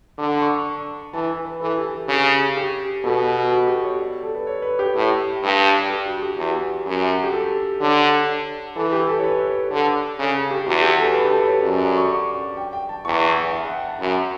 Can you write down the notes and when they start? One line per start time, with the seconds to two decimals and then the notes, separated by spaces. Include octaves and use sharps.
0.18 D3 D6
0.42 C#6
1.13 E3 A5
1.45 B4
1.61 E3 A4
1.77 G4
1.93 A4
2.08 C#3 G4
2.57 G4
3.04 B2 A4
3.51 F#4
3.67 G4
3.83 C#5
3.99 D5
4.23 A4
4.35 B4
4.47 C#5
4.62 B4
4.79 G4
4.95 A2
5.42 G2
5.90 G4
6.06 F#4
6.22 G4
6.37 E2
6.86 F#2
7.24 G4
7.33 A4
7.80 D3 C#5
8.76 E3 A4
8.92 G4
9.07 A4
9.18 C#5
9.24 B4
9.47 B4
9.71 D3 A4
10.19 C#3 A4
10.35 A4
10.51 G4
10.66 E2 F#4
10.82 G4
10.98 A4
11.14 B4
11.25 G4
11.30 A4
11.46 C#5
11.62 F#2 D5
11.74 D5
11.86 A5
11.97 C#6
12.10 D6
12.34 D6
12.57 G5
12.73 G5
12.89 A5
13.05 E2 C#6
13.50 E5
13.63 F#5
13.75 G5
13.87 A5
14.00 F#2 B5